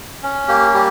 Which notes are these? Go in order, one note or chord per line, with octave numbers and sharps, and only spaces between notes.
C#4
A#3 G4
G3 G4